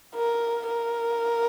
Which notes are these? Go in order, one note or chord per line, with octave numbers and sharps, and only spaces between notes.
A#4
A#4